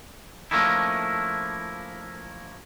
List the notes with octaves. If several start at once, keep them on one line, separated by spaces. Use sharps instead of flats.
F3 A3 A#3 C#4 D#4 E4